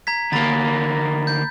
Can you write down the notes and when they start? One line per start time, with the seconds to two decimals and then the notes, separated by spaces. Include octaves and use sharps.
0.07 A#5 G#6 B6
0.33 D2 A#3 A#5 B5 A6
1.27 G6